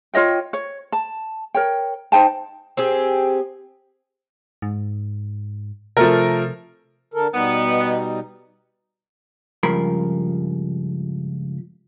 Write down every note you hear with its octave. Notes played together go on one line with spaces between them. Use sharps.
F4 C#5 D#5 G5
C#5
A5
A#4 C#5 G5
D#4 C5 G5 A5
C4 G4 G#4
G#2
C3 F3 A3 A#4
D3 A4 A#4
B2 G3 B3 D#4
C#2 G2 F3 A#4 B5